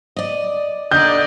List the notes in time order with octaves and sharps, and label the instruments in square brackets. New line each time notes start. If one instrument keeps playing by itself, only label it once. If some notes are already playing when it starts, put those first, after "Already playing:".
[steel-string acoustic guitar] D5 D#5
[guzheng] D3 D#4 [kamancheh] D5 D#5 [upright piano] G6